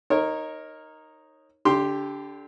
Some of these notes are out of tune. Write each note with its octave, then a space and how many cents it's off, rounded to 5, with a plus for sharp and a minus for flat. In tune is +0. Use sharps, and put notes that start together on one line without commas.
D#4 +0 A#4 +0 C#5 -25
D3 -20 G4 +0 C6 +0